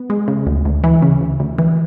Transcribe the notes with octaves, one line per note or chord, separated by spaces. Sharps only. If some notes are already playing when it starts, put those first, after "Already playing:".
Already playing: B3
G#3
C#3
D2
D2
E3
C#3
D2
D2
E3